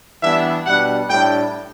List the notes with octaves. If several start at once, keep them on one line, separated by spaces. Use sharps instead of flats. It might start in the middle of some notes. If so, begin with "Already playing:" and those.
E3 G3 B3 D4 E5
B2 G3 D4 F#5
A2 G3 D4 G5